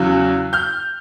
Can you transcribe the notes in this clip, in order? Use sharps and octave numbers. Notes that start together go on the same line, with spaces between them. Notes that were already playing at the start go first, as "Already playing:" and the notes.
Already playing: E2 C#3 F#3 E6 F#6
F6 G6